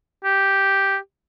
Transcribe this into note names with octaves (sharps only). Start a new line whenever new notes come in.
G4